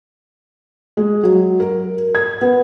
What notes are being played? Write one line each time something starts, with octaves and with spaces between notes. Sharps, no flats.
G#3
F#3
A#4
G#6
B3